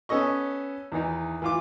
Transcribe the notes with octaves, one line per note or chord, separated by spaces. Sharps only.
B3 C#4 A4 D#5 C#6
E2 D#3 E3 D#4
E3 F4 D6